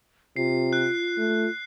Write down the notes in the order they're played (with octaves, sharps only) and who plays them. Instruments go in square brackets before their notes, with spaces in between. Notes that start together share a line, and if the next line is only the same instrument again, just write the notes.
[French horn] C3 [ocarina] F4 [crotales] C7
[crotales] F#6
[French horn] A3